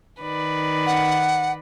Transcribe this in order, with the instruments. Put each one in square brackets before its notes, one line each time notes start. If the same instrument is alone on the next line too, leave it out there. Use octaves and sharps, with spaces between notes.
[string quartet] D#3 B4 D5
[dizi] F#5